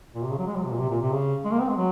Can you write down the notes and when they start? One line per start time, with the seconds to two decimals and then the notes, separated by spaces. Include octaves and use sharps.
0.15 A#2
0.23 C3
0.31 C#3
0.39 F#3
0.47 G#3
0.56 F#3
0.64 C3
0.71 A#2
0.79 C3
0.90 A#2
1.01 C3
1.12 C#3
1.45 G#3
1.52 A#3
1.61 C4
1.69 G#3
1.77 F#3